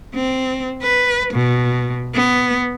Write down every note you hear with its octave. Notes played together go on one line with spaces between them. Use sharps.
C4
B4
B2
B3